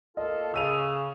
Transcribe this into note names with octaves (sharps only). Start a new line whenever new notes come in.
A#3 F4 A4 D#5
C#3 E6 D#7 F7